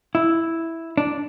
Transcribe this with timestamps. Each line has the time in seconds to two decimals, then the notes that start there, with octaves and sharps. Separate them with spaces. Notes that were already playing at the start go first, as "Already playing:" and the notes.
0.15 E4
0.97 D4